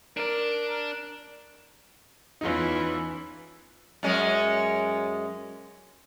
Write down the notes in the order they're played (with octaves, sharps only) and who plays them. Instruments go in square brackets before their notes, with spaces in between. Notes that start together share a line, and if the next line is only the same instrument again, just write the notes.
[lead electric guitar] D4 D5 [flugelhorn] A#4
[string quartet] E2 E3 C#4 [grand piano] D#4 F4
[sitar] F#2 G#3 C#4